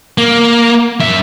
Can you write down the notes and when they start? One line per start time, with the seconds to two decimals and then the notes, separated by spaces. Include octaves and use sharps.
0.18 A#3
1.00 F#2 E5